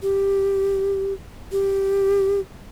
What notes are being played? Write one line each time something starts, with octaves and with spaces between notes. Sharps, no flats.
G4
G4